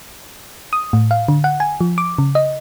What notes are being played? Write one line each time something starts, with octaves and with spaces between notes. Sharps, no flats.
D#6
A2
F5
D3
F#5
G#5
F3
D6
C#3
D#5